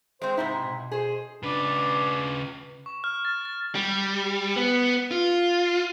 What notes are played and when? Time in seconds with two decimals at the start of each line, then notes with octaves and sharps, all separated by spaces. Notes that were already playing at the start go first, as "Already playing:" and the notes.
0.22 G#3 C4 C5
0.37 G#2 C3 D#4 E4
0.58 B2
0.91 G#4 C5
1.43 C#3 D4 B4
2.86 C#6
3.04 F6
3.25 A6
3.45 A6
3.75 G3
4.56 B3
5.11 F4